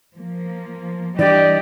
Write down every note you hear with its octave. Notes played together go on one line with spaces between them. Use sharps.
F3 A#3
E3 G3 D4 G4 D5 D#5